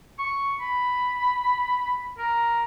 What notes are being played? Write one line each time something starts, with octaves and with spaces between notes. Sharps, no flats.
C#6
B5
A#4